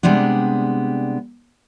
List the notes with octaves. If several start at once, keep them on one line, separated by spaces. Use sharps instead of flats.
C3 G3 G#3 B3 D4